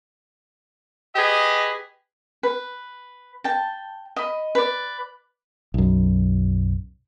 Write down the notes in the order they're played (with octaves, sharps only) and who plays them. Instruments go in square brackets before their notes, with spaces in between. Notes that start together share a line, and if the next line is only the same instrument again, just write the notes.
[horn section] G4 G#4 B4 D#5
[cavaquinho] B4
G5 A5
D#5 B5
B4 D5
[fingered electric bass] B1 F#2